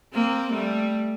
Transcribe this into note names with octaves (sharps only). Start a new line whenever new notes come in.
A#3 C4
G3 A3